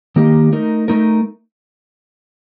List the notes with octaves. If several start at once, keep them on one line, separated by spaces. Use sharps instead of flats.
D#3 A#3 D#4 G4
A3 D#4 A#4
A3 D#4 A#4